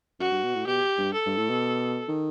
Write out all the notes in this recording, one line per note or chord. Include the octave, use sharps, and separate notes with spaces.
F#2 F#4
G2
B2
A2
B2 G4
G2
A4
G2
A2
B2
D#3